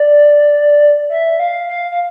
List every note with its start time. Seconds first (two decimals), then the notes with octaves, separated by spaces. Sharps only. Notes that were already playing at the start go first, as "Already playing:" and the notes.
Already playing: D5
1.10 E5
1.40 F5
1.69 F5
1.92 F5